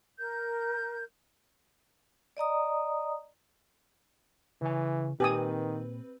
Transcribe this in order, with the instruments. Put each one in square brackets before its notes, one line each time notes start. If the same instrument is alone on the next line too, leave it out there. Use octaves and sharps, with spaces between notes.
[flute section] A#4 G6
[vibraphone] D5 D#5 A#5 D#6
[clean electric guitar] C#3 G#5 [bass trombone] E3
[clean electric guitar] A#2 [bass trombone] D#3 [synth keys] C4 B4 [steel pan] G4 G#5 D#6